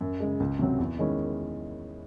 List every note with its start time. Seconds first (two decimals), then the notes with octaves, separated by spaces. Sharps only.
0.01 F#2
0.20 C#3 G#3
0.40 C#2
0.59 C3 F#3 C4
0.78 E2
0.99 D#3 G#3 C#4 E4